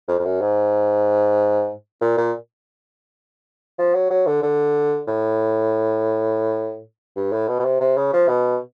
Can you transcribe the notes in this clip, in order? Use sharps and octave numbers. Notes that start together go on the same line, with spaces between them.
F2
F2
F#2
G#2
A#2
A#2
F3
F#3
F#3
D3
D3
A2
G2
A2
B2
B2
C3
C3
C#3
F3
B2